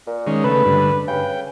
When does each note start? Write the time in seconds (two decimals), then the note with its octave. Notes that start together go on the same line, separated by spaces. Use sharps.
0.07 A#2
0.27 D#3 G#3 C#4
0.44 C#3 A3 B4
0.65 G2 D3
1.08 C#3 G5